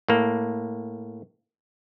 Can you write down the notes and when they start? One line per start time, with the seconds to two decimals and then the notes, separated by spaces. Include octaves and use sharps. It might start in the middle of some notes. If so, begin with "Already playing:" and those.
0.08 A2 A#3